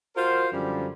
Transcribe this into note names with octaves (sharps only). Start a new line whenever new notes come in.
F4 F#4 A#4 C5
F#2 D3 F3 G3